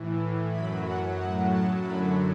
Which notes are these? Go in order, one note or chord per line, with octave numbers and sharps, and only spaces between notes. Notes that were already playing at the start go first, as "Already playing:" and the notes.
Already playing: A2 E3
F#2 F#3 B5
F#5
A2 F#3 F#5
A5
F#2 D3 F#3 B5